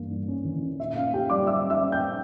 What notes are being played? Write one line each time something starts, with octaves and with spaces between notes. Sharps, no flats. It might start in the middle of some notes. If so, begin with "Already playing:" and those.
Already playing: G2 E3 A#3
G2
C#4
E3
C#4
A#2 E5
C#4 F5
C#4 G4 G5
G3 D5 D6
G3 E5 E6
C#4
E5 E6
C#4
G5 G6
C#4